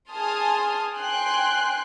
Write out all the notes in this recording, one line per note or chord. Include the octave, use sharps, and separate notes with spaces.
G#4 G#5 A5 C6 D#6 F6
G5 G#5 C6 F#6